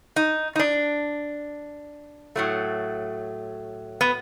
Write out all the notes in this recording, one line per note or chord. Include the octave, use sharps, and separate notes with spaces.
D#4
D#4
D4
A2 F#3 A3
B3